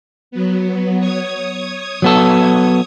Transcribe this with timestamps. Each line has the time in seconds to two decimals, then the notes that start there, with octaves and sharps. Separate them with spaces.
0.31 F#3 B3
0.99 C#5 D#6 G#6
2.02 F#3 B3 A4